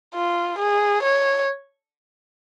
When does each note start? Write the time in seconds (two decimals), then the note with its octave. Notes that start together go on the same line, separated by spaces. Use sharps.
0.15 F4
0.59 G#4
1.03 C#5